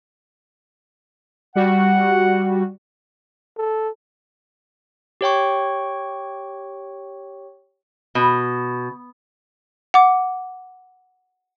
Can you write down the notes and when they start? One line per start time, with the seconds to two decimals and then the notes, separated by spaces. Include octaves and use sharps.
1.56 G3 F#4 F#5
3.58 A4
5.21 G4 C#5 G5 C#6
8.15 B2
9.94 F#5 D6